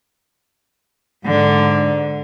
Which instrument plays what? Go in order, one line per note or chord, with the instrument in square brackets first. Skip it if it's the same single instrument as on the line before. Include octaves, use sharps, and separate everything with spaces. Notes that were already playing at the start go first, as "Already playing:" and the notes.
[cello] G#2 D3